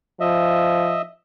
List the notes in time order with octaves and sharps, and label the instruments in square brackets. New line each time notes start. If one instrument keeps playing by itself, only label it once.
[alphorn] F3 [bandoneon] D#5 E5